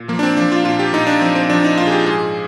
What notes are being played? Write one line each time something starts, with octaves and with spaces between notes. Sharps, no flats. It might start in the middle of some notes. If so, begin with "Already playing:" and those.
Already playing: A#2
F3 A#3
D4
C4
F3 D4
F4
A#2 F4
G4
A#2 D#4
D4
F3 C4
C4
F3 D4
D#4
A#2 F4
G#4
G4
G#2 G#4